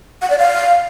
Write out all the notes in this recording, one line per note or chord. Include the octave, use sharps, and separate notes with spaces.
F#5
D5
F5